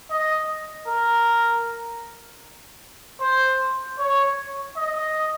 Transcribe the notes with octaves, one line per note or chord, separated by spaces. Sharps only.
D#5
A#4
C5
C#5
D#5